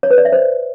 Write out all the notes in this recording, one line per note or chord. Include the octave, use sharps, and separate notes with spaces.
C#5
B4
D5
E5
C5